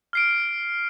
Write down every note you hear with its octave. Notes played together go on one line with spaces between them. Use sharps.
F6 C7 D7